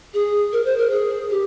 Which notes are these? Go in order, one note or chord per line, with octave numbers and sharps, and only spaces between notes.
G#4
A#4
C5
A#4
G#4
G4